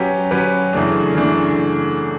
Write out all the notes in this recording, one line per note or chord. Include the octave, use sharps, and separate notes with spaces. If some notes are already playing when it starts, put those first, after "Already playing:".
Already playing: F#3 C#4 G4 B4
F#3 C#4 G4 B4
F#2 C#3 E3 A3 D4
C#3 E3 A3 D4